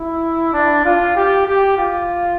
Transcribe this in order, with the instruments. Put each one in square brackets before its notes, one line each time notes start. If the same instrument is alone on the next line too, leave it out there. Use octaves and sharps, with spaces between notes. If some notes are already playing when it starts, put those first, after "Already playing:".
Already playing: [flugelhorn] E4
D4
F4
G4
G4
F4